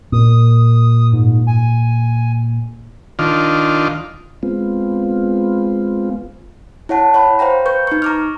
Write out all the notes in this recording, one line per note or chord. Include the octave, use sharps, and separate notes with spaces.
A#2 D#6
G#2
G#5
D#3 D4 F4
G#3 B3 C4 F4
E4 C#5 F#5 A5
C#5 F#5 B5
C5 F5 G5 A#5
B4 C#6 G6
D#4 C#6
A#5 D6 F6